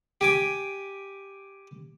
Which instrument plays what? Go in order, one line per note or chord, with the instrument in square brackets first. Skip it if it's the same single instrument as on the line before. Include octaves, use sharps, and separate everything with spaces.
[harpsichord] G4 G#5 D6